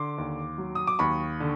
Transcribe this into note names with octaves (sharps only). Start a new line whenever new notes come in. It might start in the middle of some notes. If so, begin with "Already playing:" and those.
Already playing: D3 C6 D6
D#2
F#3
D#6
D6
D#2 B5 C#6
D3